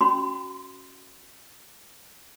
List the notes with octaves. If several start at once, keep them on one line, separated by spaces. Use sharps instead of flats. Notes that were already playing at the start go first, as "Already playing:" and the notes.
C#4 F#4 B5 C6